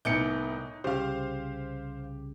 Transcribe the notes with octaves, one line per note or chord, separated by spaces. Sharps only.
C2 A2 B3 D#4 G#5 D6 G6 C#7
C2 C#3 G4 C5 F5